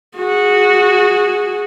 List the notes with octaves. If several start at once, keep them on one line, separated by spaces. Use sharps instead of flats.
F#4 G#4